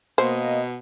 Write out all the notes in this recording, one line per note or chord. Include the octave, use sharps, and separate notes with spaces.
B2 A#3 C5 D#5